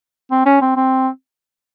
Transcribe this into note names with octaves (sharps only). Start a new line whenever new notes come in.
C4
C#4
C4
C4